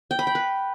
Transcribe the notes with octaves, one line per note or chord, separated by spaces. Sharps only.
G5
B5
G5
B4